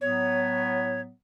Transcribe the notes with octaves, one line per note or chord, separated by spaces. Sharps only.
A2 F#3 B3 C#5